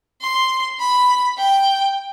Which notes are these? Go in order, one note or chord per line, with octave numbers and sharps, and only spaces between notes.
C6
B5
G5